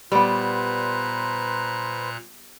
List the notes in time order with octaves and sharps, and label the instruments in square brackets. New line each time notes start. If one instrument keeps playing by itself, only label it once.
[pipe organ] A#2 A#5 F#6 [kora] G3 B3 [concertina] B4 C5